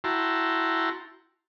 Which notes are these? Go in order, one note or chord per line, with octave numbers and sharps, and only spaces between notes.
E4 F#4 G5 A5 A#5 C6